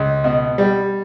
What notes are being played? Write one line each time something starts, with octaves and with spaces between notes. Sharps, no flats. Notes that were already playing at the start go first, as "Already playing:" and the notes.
Already playing: C#2
B2
G3